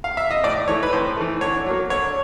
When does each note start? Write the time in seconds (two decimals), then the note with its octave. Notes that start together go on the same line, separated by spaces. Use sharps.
0.04 F5
0.17 E5
0.31 D#5
0.44 A2 D5
0.68 E3 A3 C#5
0.83 B4
0.93 A2 C5
1.17 E3 A3
1.41 D3 C#5
1.66 F#3 A#3
1.90 D3 C#5